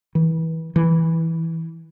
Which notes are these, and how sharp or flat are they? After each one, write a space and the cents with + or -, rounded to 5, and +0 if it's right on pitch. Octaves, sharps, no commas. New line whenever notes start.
E3 -30
E3 -10